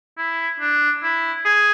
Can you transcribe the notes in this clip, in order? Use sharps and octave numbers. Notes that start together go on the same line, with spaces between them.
E4
D4
E4
G#4